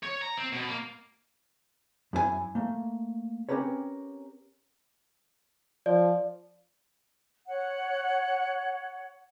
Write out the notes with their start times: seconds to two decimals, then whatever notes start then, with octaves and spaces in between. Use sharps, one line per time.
0.03 C#5
0.21 A#5
0.37 C4
0.52 B2
0.69 A#3
2.13 F#2 E4 A#4 G#5
2.55 A3 A#3
3.49 C4 C#4 G4 A#4 B4 C#5
5.86 F3 D5
7.46 C#5 F#5